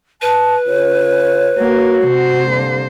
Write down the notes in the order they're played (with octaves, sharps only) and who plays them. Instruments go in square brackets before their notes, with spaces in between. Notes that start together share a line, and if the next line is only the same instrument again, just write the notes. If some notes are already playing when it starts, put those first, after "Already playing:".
[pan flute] B4 [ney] A5
[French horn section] C#3 F4 [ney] C#5
[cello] A#3 [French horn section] F#4
[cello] C3 C5
[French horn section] D3 G3 A#3